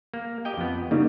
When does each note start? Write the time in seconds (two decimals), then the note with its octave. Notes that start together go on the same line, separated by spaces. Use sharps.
0.14 A#3
0.45 G4 D#5 G5
0.57 F2 B3
0.91 C#3 G3 A#3 D#4